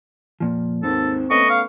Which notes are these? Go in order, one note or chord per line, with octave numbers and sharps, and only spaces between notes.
F2 A#2 F3
D#2 G#2 C4 A4
A3 B3 C#4 D#5 C#6
F5